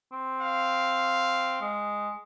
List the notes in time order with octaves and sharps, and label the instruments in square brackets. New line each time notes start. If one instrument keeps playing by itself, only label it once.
[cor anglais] C4
[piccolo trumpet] F5
[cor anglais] G#3